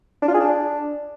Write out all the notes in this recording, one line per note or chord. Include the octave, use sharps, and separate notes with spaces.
D4
F4
G#4
D4